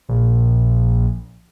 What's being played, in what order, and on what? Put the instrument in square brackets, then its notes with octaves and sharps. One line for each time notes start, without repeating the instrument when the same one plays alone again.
[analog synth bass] A#1